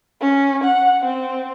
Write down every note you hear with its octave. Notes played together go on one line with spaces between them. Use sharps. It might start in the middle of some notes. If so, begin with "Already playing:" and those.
C#4
F#5
C4